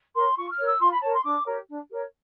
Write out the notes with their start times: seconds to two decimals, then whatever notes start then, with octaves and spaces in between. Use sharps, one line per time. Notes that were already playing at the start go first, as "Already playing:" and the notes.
0.15 A#4 C#5 C6
0.36 F4 C#6
0.51 F6
0.59 A#4 C#5
0.66 E6
0.80 F4 C6
0.92 B5
1.02 A#4 C#5 A5
1.13 C6
1.24 D4 D6
1.46 G4 A#4 C#5
1.68 D4
1.89 G4 A#4 C#5